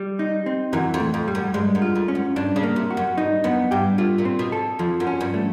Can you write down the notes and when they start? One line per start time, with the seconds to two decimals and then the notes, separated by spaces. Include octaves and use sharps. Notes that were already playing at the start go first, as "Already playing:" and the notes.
Already playing: G3
0.19 D#4
0.46 C4
0.73 F#2 E3
0.94 F2
1.00 A2
1.14 F2
1.28 G3
1.35 F#2
1.54 G2 G#3
1.75 F#2
1.82 F4
1.95 F2
2.08 C#4
2.15 F#2
2.36 G2 D4
2.56 C#3
2.63 A#3
2.76 C3
2.90 F#4
2.97 F#2
3.18 G2 D#4
3.44 F#2 B3
3.71 G2 G4
3.98 A2 F4
4.18 A#2
4.25 C4
4.39 B2
4.52 A4
4.79 F2 F3
5.00 F#2
5.07 C#4
5.21 G2
5.34 A3